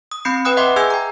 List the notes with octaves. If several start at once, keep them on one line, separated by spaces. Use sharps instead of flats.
D#6
C4 B5 G6 C7 C#7
B4 G5 D#6 F#6
D#5 E5 F#5 G5 C6 D6
G#4 F#5 G#5 E6 G6 G#6
G5 A#5